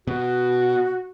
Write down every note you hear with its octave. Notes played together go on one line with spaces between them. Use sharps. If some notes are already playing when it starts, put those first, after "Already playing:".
B2 F#4